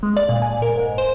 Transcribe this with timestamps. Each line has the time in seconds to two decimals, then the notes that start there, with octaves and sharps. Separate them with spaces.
0.03 G#3
0.17 D5
0.29 A#2
0.42 G#5
0.62 A#4
0.76 G#2
0.98 C5